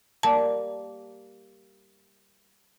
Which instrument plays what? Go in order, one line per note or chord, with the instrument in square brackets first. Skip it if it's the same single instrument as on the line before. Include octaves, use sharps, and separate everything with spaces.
[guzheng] G3 A#3 [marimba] A5